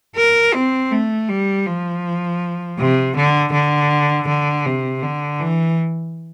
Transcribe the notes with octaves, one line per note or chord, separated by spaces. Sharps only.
A#4
C4
A3
G3
F3
C3
D3
D3
D3
C3
D3
E3